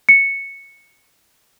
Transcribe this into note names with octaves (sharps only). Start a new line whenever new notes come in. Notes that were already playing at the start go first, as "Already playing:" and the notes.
C#7